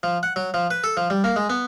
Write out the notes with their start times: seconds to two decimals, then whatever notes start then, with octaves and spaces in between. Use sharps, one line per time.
0.03 F3
0.23 F#5
0.36 F#3
0.54 F3
0.71 B4
0.84 A4
0.97 F3
1.10 G3
1.24 A#3
1.36 G#3
1.50 B3